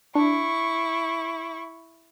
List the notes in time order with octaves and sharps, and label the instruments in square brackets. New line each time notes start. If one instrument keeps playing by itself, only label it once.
[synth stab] D4 [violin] E4 C#6